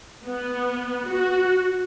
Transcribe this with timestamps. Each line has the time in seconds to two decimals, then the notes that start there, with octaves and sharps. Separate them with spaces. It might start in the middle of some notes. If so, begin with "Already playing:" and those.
0.24 B3
1.06 F#4